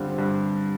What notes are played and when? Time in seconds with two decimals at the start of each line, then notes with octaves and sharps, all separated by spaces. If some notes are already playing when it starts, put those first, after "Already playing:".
Already playing: G2 D3 G3 C4 F4
0.18 G2